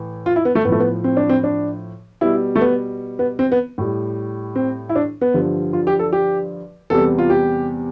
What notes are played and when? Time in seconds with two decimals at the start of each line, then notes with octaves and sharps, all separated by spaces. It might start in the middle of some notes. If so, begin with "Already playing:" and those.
Already playing: A2 E3
0.26 F4
0.36 E4
0.45 B3
0.55 A3
0.65 A2 B3
0.69 F3 A3
0.80 B3
1.04 C4
1.17 D4
1.29 C4
1.44 D4
2.21 B2 G3 E4
2.56 A3
2.61 B3
3.19 B3
3.39 C4
3.52 B3
3.78 A2 G3
4.55 C4
4.89 E4
4.95 D4
5.21 B3
5.34 G2 D3 F3
5.73 F4
5.87 G4
5.99 A4
6.12 G4
6.90 E2 C3 G3 A4
7.18 F4
7.30 G4